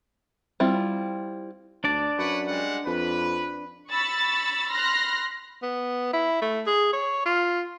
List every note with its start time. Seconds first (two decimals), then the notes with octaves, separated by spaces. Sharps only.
0.60 G3 C4 E4 F4
1.84 D2 D4 D5 A5
2.19 F#2 B4 C#5 F#5
2.47 G3 G#3 F#5
2.86 F2 B4
3.91 B5 C#6 E6 A6
4.71 B5 C6 F6 F#6 A#6
5.63 B3
6.13 E4
6.42 A3
6.67 G#4
6.93 C#5
7.26 F4